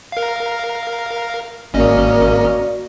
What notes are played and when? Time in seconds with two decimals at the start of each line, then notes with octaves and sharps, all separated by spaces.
0.12 A#4 F5
1.74 G#1 A#3 C#4 F#4 D5 D#5